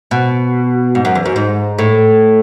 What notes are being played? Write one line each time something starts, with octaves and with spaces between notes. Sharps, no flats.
B2
G#2
F#2
E2
F#2
G#2
A2